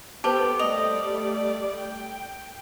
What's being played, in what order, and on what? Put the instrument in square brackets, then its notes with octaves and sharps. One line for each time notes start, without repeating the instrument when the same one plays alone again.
[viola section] B3 A4 [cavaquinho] G4 [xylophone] B4 C5 A5
[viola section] G3 A3 D5 [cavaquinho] D#5 [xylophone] F7
[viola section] G5